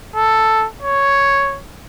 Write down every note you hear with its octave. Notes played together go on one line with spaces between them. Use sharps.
A4
C#5